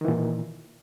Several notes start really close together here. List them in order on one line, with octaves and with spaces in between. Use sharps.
D#3 E3 A#2